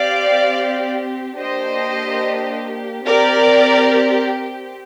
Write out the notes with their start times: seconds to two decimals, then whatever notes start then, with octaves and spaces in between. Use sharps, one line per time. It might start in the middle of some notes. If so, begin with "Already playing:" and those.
Already playing: C4 G4 D5 F5
1.38 A#3 D4 G4 C5 D#5
3.06 C4 G4 A#4 D5